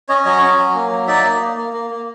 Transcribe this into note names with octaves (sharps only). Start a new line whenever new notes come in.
C#4 C#5 D#5
F#3 C#5 D#5
C#4
F#3
A#3
F#3
D#4 D5 E5
A#3
A#3
A#3
A#3
A#3